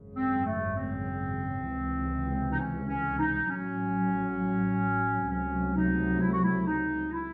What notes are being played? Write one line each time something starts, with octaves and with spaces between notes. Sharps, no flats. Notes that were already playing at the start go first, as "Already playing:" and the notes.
Already playing: G#1 F#2 C#3
C4
A3
C4
C#2 C3 E3
D#4
C#4
C#4
D#4
A1 A2 F#3 C#4
C#2 C3 F#3 A3 C#4
D#4
E4
F#4
E4
D#4
E4